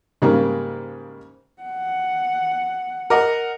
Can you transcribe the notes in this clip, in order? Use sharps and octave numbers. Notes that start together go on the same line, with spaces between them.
G#2 C#3 G3 A#3
F#5
A#4 D#5 F#5